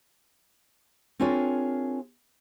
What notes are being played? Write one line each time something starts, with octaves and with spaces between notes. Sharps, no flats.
C4 D4 F4 G#4 A#4 C#5